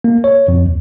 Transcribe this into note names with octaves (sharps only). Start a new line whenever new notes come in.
A#3
C#5
F2
D#2